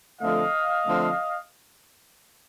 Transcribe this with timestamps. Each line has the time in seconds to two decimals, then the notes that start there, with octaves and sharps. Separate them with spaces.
0.21 D3 F3 A3 C4 D#5 F5
0.86 D3 F3 A3 C4